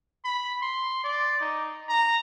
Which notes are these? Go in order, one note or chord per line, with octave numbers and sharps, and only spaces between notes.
B5
C6
D5
D#4
A#5